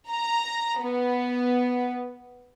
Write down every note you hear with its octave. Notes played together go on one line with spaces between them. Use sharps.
A#5
B3